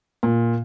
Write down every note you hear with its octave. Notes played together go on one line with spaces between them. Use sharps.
A#2